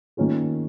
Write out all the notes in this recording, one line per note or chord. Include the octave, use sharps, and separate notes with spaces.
D#3 A#3 C#4 F4 G#4